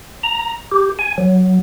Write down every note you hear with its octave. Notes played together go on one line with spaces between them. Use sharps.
A#5
G4
G#5
F#3